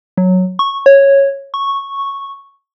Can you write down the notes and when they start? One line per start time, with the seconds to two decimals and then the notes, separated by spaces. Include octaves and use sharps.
0.18 F#3
0.59 C#6
0.86 C#5
1.54 C#6